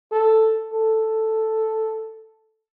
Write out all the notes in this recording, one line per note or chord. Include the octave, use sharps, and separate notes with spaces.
A4
A4